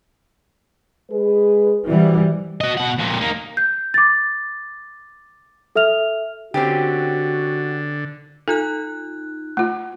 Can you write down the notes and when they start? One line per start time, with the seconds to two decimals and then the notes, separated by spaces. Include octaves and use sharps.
1.11 G#3 G#4 B4
1.87 E3 G3 C4 F#4
2.61 F#4 D#5
2.77 B2 F#5
2.99 F2 A#2
3.21 A#3 D#4
3.57 G6
3.94 D6 A6
5.76 A4 E5 F6 F7
6.54 D3 C4 C#4 F#4 G4
8.48 D#4 F4 A4 F#6
9.57 A3 F4